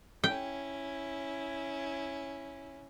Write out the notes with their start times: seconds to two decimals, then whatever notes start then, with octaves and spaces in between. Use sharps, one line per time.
0.24 C#4 E4 G5